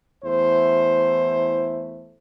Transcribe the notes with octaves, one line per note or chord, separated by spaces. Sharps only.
E2 A3 E4 C5